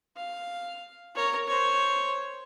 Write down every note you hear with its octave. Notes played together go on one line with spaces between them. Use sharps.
F5
A#4 C#5
C5 C#5